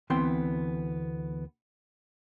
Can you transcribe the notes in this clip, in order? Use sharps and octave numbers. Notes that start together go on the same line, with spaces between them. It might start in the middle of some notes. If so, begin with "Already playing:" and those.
D2 E3 B3 C4 G5 C6